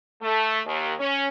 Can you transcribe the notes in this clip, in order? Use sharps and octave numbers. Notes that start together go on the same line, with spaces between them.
A3
D#2
C#4